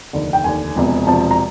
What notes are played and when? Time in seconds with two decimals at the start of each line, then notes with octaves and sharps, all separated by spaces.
0.13 F1 D#2 D3
0.33 G5
0.44 F1 D#2 D3 G#5
0.76 E1 E2 C3 F3
1.07 E1 E2 C3 F3 A5
1.31 A#5